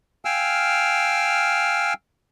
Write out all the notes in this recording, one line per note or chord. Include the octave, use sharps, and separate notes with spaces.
F5 G5 G#5 E6 F6